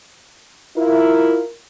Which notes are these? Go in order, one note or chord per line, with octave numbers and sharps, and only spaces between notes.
E4 F4 A#4